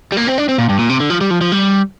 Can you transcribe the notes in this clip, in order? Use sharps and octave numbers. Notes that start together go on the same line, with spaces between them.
G3
A#3
C4
D4
C4
A#2
G2
A#2
C3
D3
F3
G3
F3
F3
G3